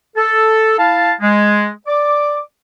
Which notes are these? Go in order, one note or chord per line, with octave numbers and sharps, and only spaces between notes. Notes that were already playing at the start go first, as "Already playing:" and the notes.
A4
E4 F5 A5
G#3
D5 D6